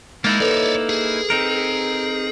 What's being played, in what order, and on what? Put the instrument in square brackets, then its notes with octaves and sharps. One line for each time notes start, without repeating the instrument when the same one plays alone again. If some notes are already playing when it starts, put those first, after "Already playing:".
[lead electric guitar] G#3 [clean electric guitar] A#3 D#4 E4 [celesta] A6
[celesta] A4 B4 F7 [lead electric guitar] C#5 D5
[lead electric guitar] G#4
[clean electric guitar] C4 D#4 A#4